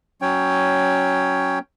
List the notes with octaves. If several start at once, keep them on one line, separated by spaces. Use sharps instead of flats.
F#3 C#4 C#5 G5